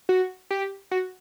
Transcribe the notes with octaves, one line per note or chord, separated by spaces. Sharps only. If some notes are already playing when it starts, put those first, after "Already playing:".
F#4
G4
F#4